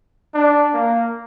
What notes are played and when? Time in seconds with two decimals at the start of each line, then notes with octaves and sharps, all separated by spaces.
0.34 D4
0.74 A#3